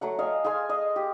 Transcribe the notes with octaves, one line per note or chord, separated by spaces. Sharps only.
F#3 A3 F#5
D#5 F5 G#5
G#4 F5 G#5 C6
D#5
G4